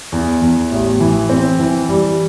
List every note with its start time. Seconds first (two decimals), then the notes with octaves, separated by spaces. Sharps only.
0.12 E2
0.42 E2
0.71 A1
1.00 E3
1.30 C4
1.59 E3
1.89 G3